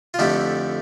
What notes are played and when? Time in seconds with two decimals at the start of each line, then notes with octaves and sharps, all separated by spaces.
0.14 F4
0.19 F2 D3 A3 E4 G4